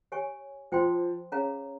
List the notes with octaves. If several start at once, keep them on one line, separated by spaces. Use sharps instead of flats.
G4 C#5 G#5 C#6
F3 C5 G5 C6
C#4 G#4 C#5 F5 A#5